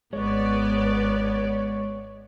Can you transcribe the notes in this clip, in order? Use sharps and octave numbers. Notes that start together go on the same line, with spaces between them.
G#1 G#3 B3 C#5 D5